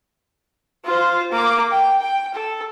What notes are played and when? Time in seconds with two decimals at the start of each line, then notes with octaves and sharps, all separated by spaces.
0.85 F4 C5
1.32 A#3 D6
1.71 G5
2.01 G5
2.34 A4